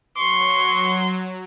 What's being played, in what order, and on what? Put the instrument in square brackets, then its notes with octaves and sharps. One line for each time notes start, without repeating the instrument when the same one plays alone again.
[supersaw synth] F#3 [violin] C6 [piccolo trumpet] C#6